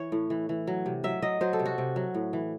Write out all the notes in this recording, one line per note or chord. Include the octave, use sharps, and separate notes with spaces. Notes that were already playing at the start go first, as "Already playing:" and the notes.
Already playing: E3 C#5
A2
E3
E3
F#3
C3
F#3 E5
F#3 D#5
F#3 C5
A4
C3
F#4
C3
F#3
A2
E3